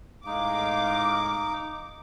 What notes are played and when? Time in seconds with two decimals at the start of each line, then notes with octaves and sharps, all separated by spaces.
0.26 A2 G#3 D#4 F5 D6